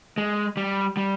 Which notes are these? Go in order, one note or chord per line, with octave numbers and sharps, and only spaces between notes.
G#3
G3
G3